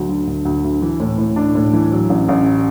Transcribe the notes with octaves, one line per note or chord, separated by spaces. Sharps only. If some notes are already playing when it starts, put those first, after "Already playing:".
Already playing: D2 F#3
D3
D2
D2
D2
E3
A2
A2
D4
A2
E3
F#3
A1
A1